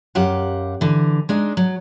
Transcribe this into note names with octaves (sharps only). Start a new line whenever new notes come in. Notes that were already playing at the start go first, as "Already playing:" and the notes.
F#2 G4 F5 F#5
D3 E3
G#3 D4 D#4
F#3